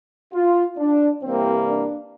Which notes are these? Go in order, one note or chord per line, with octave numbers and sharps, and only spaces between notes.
F4
D4
C2 C3 E3 G3 A#3 C4
D4